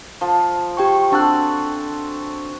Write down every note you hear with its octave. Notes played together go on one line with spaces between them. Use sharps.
F3
G4 G5 C#6
C4 D4 F#4 A4 F#6